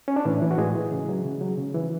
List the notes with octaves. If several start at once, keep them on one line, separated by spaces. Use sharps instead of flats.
C#4
D4
A2 E3 E4
E3
F#4
A2 G#3 G#4
E3
C#3
F#3
C#3
F#3
C#3
E3